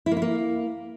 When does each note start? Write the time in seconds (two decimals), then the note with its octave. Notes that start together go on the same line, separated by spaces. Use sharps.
0.06 E4
0.11 A#3
0.17 E4
0.22 A#3